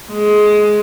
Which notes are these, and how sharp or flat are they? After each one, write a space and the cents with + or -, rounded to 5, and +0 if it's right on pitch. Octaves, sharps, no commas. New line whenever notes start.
G#3 +15